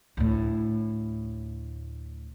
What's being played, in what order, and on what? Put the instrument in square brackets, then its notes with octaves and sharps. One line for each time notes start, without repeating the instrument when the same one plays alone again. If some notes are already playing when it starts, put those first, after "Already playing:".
[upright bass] D2 A2